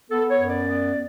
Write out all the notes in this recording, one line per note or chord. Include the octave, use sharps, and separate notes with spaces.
B3 A4
C#5
F#2
D5
B3